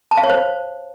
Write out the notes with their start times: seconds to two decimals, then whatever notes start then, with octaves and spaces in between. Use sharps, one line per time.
0.11 A5
0.17 F5
0.24 C#5
0.30 C5